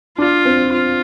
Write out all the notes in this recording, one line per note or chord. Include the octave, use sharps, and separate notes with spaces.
D4 F4
C4
F4